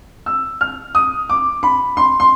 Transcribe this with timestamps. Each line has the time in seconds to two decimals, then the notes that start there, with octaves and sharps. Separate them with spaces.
0.26 E6
0.61 F6
0.95 D#6
1.29 D6
1.63 B5
1.97 C6
2.20 C6